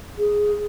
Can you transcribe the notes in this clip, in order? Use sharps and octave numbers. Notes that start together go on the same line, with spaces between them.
G#4